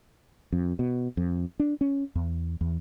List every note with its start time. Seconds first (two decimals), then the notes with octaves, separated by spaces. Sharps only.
0.52 F2
0.79 B2
1.17 F2
1.60 D4
1.81 C#4
2.15 E2
2.61 E2